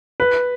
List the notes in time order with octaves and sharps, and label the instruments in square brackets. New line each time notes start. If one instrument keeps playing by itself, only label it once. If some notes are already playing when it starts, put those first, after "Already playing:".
[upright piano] B4